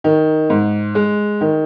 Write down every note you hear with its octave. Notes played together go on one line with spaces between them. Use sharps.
D#3
G#2
G#3
D#3